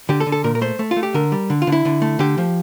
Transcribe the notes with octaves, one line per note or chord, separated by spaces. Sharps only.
D3 G4
A4
D3
A4
A#2 A#4
A#4
A3 C5
A3
F4
A3
G4
D3 A#4
G3
D3
F4
D3
E4
D3
A3
D3 G4
F3